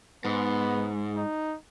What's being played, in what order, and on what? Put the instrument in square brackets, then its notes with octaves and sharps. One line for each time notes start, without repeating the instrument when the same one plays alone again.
[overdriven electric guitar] G#2 [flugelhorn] B3
[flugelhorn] D#4